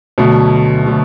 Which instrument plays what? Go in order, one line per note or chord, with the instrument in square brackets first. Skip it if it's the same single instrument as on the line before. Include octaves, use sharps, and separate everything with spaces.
[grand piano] D2 D3 F#3 A3 [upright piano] B2
[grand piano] D3 F#3 A3